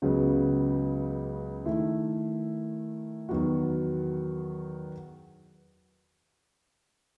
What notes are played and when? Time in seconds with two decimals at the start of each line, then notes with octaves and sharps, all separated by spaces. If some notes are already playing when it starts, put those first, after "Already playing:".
0.02 C#2 C#3 F#3 B3
1.65 D#3 A3 E4
3.29 E2 D#3 F#3 B3 F#4